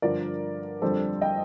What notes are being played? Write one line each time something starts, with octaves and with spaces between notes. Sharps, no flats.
G2 D3 F3 A#4 D5
F2 D3 G3 A4 C5
D#5 G5